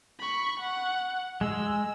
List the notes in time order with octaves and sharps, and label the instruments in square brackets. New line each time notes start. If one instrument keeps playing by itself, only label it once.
[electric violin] B5 C#6
F#5
[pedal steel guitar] G#3 [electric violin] E6